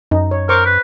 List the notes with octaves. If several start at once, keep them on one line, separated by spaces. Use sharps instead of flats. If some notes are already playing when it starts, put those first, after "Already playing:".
F#2 D#4
C#5
A#4 C5 C#6 D6
B4